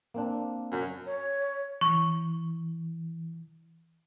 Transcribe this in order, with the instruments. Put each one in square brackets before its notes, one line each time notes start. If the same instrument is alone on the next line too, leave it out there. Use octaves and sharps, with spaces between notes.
[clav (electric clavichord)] A#3 C4 D4
[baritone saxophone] F#2
[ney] C#5
[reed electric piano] E3 [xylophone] C#6